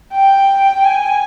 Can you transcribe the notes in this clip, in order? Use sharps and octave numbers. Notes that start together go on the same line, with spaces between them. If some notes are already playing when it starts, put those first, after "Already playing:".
G5
G#5